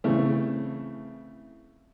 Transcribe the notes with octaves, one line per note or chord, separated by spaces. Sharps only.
C#3 E3 A3 C4